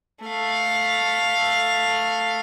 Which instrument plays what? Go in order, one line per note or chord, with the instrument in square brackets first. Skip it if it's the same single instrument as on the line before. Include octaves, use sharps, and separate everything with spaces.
[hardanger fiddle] A3 F5